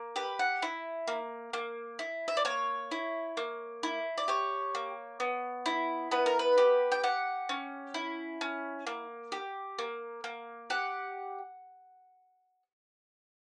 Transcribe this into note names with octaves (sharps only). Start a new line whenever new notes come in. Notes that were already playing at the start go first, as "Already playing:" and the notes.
Already playing: A#3
G4 B4
F#5
E4
A#3
A#3
E4
E5
D5
A#3 C#5
E4
A#3
E4
D5
G4 C#5
A#3
B3
E4
B3 B4
A#4
B4
G4
G5
G4 F#5
C#4
E4
C#4
A#3
G4
A#3
A#3
G4 F#5